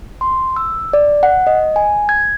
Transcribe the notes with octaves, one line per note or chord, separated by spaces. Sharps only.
C6
E6
D5
F#5
D#5
G#5
G#6